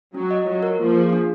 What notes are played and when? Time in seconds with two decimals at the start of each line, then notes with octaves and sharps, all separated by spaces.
0.14 F#3 C#4
0.31 D#5
0.47 F#3 F4
0.63 A#4
0.79 F3 A#3
0.96 G#4
1.13 D4